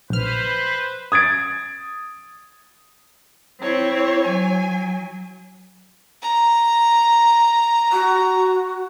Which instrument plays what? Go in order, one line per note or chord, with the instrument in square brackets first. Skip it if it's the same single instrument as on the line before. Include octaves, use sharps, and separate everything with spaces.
[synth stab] A#1 F6 [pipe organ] B4 C5
[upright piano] D#6 G#6 A6 D7
[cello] C4 [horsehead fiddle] E4 [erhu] C#5
[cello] F#3 [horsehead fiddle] G#5
[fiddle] A#5
[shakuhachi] F#4